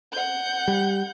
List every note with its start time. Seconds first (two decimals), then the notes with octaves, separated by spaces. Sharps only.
0.12 F#5 G6
0.68 G3